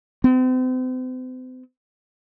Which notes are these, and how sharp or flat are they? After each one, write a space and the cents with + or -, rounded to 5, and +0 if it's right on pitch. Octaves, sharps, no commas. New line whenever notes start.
C4 -40